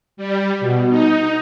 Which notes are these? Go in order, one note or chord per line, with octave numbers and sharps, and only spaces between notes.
G3
B2
D#4